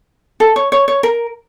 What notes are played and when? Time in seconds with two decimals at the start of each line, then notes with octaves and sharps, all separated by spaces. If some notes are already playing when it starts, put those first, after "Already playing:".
0.40 A4
0.56 C#5
0.72 C#5
0.88 C#5
1.03 A#4